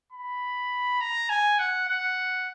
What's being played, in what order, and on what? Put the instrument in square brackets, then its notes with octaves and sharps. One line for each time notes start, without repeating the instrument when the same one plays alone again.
[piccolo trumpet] B5
A#5
G#5
F#5
F#5